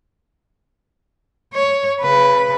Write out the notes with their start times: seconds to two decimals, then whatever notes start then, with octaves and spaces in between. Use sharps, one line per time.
1.53 C#5
2.01 C#3 B4